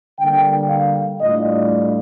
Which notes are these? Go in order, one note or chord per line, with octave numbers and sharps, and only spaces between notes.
D3 G3 A#3 G5
F5
A2 G3 D4 F4 D#5